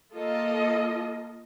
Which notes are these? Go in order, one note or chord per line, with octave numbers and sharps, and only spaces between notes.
A#3 F4 A4 D#5